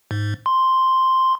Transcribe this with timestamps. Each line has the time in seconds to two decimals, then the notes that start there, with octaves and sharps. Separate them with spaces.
0.11 G#2
0.46 C6